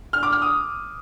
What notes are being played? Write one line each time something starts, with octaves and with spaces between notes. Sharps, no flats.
F6
D6
F6
D#6